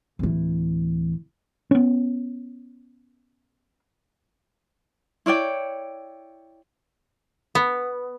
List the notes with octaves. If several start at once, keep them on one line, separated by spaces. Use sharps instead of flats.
D1 E3
B3 C#4
E4 C#5 D5 G5
B3